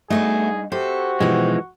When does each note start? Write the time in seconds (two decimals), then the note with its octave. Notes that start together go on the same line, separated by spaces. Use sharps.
0.10 G2 A3 B3 D#4 F#4 G#4 D#5
0.72 F#4 G4 A4 C5
1.20 B2 E3 F3 G#3 D#4